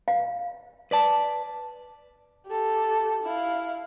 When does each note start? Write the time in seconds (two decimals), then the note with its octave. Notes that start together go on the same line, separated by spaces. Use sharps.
0.08 F5
0.91 B4 D5 A5
2.47 G4 A4
3.23 E4 F5